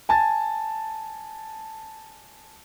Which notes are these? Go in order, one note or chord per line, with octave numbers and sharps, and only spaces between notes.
G#5 A5 A6